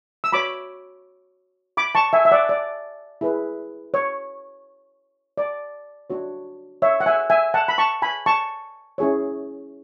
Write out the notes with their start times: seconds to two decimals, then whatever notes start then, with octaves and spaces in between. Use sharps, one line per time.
0.24 E6
0.32 F#4 C#5 B5 D6
1.77 B5 D6
1.95 A5 C#6
2.13 E5 G#5
2.25 E5
2.31 D5 F#5
2.49 D5
3.21 E4 G#4 B4
3.94 C#5
5.38 D5
6.10 D4 F#4 C#5
6.82 C#5 E5
7.00 F#5
7.06 E5 G#5
7.30 E5 G#5
7.54 F#5 A5
7.68 B5
7.78 A5 C#6
8.02 G#5 B5
8.26 A5 C#6
8.98 C#4 E4 G#4 C#5